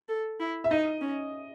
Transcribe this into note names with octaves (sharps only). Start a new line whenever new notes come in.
A4
E4
E5
D#4 D#5
C#4